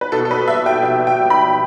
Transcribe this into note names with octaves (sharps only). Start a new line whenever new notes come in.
B4
B2 A4
A4
B4
G3 E5
G5
B2 E5
G5
G3
B5